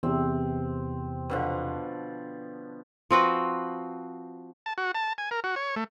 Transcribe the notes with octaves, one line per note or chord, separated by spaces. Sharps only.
E2 C3 C4
B2 D3 F3
F3 C4 F#4 B4
A5
F#4
A5
G#5
A#4
F#4
C#5
A3